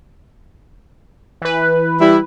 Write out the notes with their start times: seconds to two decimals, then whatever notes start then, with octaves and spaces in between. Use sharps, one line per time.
1.42 E3 B4
2.00 G3 E4